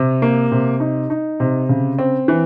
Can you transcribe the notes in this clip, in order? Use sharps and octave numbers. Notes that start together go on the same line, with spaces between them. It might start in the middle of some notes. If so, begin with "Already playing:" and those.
Already playing: C3
A#3
C3
D#4
D#4
C3
C#3
C4
E3